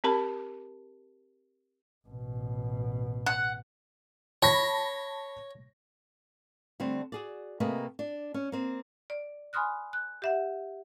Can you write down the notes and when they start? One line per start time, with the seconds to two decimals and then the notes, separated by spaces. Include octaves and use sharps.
0.04 C4 G4 A#4 A5 B5
2.08 A1 B2
3.26 F#5
4.43 C#5 A5 B5 A#6
6.80 D3 G3 A3 C4
7.12 F#4 G#4 D5
7.60 C3 A3 A#3 G#4 B4 D#5
7.99 D4
8.34 C#4
8.52 A#3 C4
9.10 D5
9.53 G#5 B5 C6 D#6 F6 F#6
9.93 F#6
10.22 G4 E5 F#5